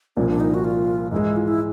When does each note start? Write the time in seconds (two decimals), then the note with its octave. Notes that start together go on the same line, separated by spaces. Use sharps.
0.17 C2 A#2 F3 C#4
0.28 D4
0.40 D#4
0.54 F#4
0.64 F4
1.11 G#2 E3 G#3 E4
1.36 F4
1.48 E4